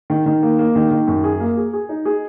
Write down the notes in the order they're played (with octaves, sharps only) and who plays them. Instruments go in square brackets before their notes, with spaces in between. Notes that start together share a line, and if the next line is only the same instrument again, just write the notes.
[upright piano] D#3
D#3
A#3
A#3
D#3
D#3
F#2
G#4
A#3
G#4
G#4
D#4
G#4